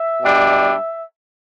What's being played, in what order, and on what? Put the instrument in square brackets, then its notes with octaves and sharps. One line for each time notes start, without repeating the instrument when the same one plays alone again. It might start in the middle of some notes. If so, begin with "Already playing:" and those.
Already playing: [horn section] E5
B2 G3 D4